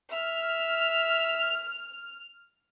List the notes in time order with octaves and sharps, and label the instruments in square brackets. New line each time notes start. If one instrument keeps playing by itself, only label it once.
[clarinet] E5 [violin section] F6